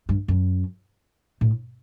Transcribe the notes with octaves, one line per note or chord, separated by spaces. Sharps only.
G2
F#2
A2